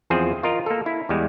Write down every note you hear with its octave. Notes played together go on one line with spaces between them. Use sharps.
E2 F3 C4 G#4 C5
F4 A#4 D#5
A#3 A4
E4
E2 G3 G#3